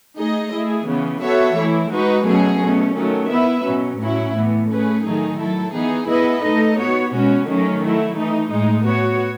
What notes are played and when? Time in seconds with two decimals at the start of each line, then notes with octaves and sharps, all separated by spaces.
0.18 A3 D#4 G#4 D#5
0.53 A3 E4 G#4
0.87 C#3 E3 B3
1.22 B3 F#4 A4 C#5 E5
1.57 E3 A3 E4
1.91 G#3 D#4 F#4 B4
2.26 B2 F#3 A3 C#4 G#4
2.61 B2 A3 C#4
2.95 D#3 F#3 A3 C#4
3.30 B3 E4 B4 E5
3.65 B2 F#3 C#4
4.00 A2 F#3 C#4 E4
4.35 A2 E3 B3
4.70 A3 C#4 G#4 B4
5.04 D#3 F#3 A3 D#4 G#4
5.39 F#3 A3 E4 A4
5.74 E3 B3 D#4 G#4
6.08 B3 E4 G#4 B4 D#5
6.43 A3 D#4 A4 D#5
6.78 B3 F#4 C#5
7.12 B2 G#3 C#4 F#4
7.47 D#3 F#3 A3 C#4
7.82 F#3 A3 E4
8.17 E3 A3 D#4
8.52 A2 G#3 D#4
8.86 B3 F#4 C#5